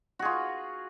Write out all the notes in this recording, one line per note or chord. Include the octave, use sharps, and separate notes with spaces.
F4 F#4 G#4